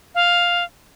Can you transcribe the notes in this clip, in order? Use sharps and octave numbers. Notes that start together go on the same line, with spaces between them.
F5